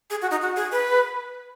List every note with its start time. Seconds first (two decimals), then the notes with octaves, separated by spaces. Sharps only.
0.10 G#4
0.22 F#4
0.31 D#4
0.42 F#4
0.56 G#4
0.72 B4